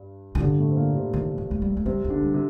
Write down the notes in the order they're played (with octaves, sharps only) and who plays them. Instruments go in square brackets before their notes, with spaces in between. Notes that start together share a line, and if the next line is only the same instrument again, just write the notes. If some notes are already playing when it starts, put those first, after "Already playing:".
Already playing: [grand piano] G2
[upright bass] D#3
[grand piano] G2 G3 [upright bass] D3
[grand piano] A2 A3
C4
A#2 A#3
C3 C4
[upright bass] D#3
D#3
A3
G3
A3
[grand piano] C3 C4 [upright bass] G3
[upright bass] A#3
[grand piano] D3 D4
[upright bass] G3
[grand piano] C3